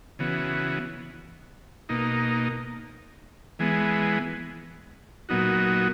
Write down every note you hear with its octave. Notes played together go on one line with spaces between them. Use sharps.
C#3 E3 B3 F#4
B2 A#3 D#4
E3 G#3 B3
A#2 F#3 B3 D#4 F#4